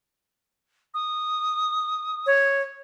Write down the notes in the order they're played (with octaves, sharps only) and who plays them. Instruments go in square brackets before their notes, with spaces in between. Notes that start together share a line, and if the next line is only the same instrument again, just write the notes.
[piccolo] D#6
[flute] C#5